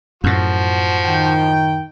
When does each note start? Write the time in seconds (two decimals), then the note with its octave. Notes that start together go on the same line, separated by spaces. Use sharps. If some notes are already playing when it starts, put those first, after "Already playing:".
0.24 F#2 A2 F3 F#4
1.06 D#3 G5